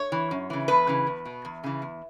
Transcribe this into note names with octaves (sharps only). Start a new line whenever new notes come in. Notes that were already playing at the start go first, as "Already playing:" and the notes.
Already playing: C#5
E3
F#2
C#3 E3
E2 B4
C#3 E3
E2
B2
E2
C#3 E3
E2